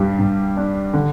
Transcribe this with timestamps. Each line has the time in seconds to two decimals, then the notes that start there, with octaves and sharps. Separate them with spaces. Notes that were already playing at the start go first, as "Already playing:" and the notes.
Already playing: G2 G3
0.19 G2
0.57 D4
0.93 D3